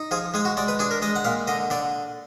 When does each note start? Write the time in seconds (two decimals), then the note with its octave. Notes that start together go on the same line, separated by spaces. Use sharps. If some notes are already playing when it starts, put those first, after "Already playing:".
Already playing: D#4
0.11 F3 G#4
0.34 G#3 G#4
0.45 F#4
0.57 G#3 D5
0.68 B4
0.79 D4 G#4
0.91 A#4
1.02 G#3 D#5
1.16 F#5
1.25 A#2 F5
1.47 D3 D#5
1.70 D3 D5